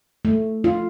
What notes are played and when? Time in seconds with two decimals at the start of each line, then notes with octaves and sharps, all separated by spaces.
0.25 A3
0.64 F4